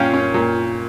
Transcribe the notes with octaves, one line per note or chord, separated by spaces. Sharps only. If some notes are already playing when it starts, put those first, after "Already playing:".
Already playing: A#2 C#4 F5 G5
C#4
A#2